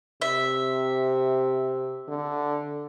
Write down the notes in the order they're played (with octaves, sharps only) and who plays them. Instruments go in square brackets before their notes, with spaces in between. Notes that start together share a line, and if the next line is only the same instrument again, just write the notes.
[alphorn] C3 [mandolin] E5
[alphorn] D3